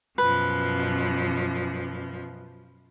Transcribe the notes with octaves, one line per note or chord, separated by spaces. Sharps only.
F#2 B2 F3 B4